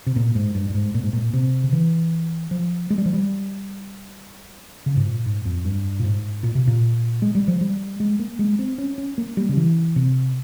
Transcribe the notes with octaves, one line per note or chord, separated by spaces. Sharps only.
C3
A#2
G#2
G2
G2
G#2
A#2
G#2
A#2
C3
C#3
E3
F3
G#3
G3
F3
G3
C#3
G#2
A#2
G#2
F2
G2
A#2
G#2
A#2
C3
A#2
G#3
G3
F3
G3
G#3
A#3
G#3
C4
C#4
C#4
A#3
G3
C#3
E3
C3